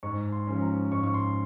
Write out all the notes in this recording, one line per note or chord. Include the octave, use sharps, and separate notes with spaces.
G#2 C#6
C6
F3 G#3 C#4
A#5
G#2 C#6
C#6
C6